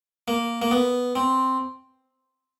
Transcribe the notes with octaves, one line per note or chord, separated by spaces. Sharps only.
A#3
A#3
B3
C4